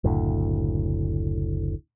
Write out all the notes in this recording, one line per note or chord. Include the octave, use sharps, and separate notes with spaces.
F#1 D2 A2